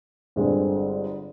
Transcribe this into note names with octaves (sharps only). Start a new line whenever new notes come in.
G1 G2 D3 G#3 C4